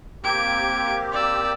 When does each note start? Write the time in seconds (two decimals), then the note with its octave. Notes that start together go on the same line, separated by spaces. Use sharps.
0.24 A#3 C4 G4 G#6 D7
1.12 D5 E6